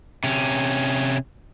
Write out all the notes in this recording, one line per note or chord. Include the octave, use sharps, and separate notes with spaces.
C3 C#4